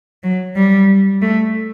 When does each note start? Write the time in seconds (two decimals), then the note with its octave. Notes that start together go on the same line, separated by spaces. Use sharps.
0.23 F#3
0.56 G3
1.22 A3